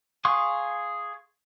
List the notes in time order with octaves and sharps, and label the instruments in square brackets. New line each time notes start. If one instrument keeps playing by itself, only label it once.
[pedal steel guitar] G#4 F5 C6 C#6 D#6